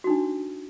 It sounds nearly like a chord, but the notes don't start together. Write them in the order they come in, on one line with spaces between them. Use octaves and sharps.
F#4 D#4 D4